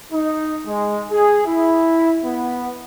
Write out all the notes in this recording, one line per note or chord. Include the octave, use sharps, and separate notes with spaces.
D#4
G#3
G#4
E4
B3